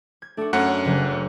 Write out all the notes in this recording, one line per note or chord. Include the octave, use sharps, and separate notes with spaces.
G#6
A3 D4 F#4
F#2 A3 C#4 F#5
F#1 F#3